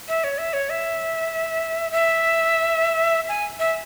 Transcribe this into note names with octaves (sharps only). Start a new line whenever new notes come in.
E5
C#5
E5
C#5
E5
E5
G#5
E5